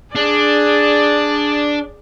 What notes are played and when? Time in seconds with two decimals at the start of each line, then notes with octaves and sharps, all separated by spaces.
0.15 D4 G#4 D5